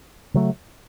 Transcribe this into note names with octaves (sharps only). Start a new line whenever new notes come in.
C#3 F#3 A3